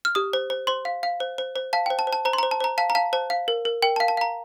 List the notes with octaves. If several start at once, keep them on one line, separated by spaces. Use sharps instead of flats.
F6
G4 D#6
C5
C5
C5 C6
F5
F5
C5
C5
C5
F5 A5
G5
C5
A5
C5
A5
C5 A#5
C6
A#5
C5
A5
C5 A#5
F5 A5
A#5
F5 A5
C5 A5
F5
A#4
A#4
A#4 G5
A5
F5
A5
F5 A#5